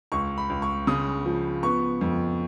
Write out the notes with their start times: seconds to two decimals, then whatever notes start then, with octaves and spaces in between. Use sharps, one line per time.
0.12 C#2 C#6
0.38 B5
0.50 C#2
0.62 C#6
0.87 C#3 D#6
1.26 F3
1.63 B3 C#6
2.01 F2